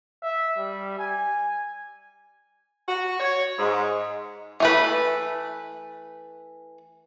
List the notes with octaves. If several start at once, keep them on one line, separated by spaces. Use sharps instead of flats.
E5
G3
G#5
F#4
C#5
G#2
E3 A3 B4